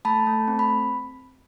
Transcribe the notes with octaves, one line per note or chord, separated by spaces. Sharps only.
A3 A5 B5
A3
C4
B5